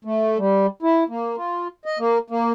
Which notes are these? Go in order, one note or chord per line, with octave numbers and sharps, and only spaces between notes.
A3
G3
E4
A#3
F4
D#5
A#3
A#3